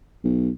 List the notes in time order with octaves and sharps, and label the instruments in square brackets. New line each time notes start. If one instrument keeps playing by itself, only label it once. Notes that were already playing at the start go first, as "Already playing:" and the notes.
[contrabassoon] B1